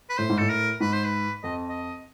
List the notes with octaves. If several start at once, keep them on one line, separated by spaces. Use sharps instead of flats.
B4
A2 C5
G#2
A2 A4
A#4
G#2 B4
C5
B4
F2 D#5
D#5